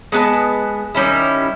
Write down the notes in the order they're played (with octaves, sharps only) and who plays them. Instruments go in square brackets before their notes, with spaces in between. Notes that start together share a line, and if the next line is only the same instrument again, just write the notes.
[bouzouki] G#3 B3 D4 A5
D#3 G3 C#4 E4